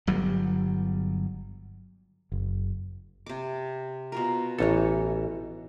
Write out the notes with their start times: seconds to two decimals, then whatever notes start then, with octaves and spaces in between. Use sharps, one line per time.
0.07 G1 F#3 G3
2.32 F#1
3.26 C3 D6
4.12 B2 F4 A#4
4.58 A1 E3 D#4 A4 C#5